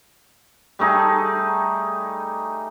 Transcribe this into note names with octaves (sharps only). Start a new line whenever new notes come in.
G3 A3 D#4 G#4